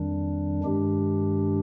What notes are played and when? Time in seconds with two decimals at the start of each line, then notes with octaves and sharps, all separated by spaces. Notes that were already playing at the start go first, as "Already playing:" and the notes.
Already playing: F2 D#3 G3 D4
0.64 G2 D#3 G#3 D4 G4